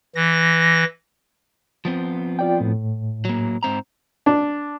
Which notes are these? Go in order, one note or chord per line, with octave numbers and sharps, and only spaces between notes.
E3 A#6
F3 B3 C4
F4 D5 G5
A2
F#3 A#3
G#2 C4 A#5
D4